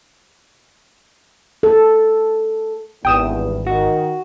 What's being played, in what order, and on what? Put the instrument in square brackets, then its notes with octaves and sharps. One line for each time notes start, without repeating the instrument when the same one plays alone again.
[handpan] A4
[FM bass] G#1 [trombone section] E2 G2 [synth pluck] G5 D#6 E7
[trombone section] D#3 [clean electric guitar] F#4